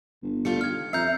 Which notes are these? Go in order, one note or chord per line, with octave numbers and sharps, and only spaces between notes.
G1
G3 A3 F4 C#7
D#3 F6 G#6
F2 D5 E5 A#5 G6 C7